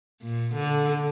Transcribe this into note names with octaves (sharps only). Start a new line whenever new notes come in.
A#2
D3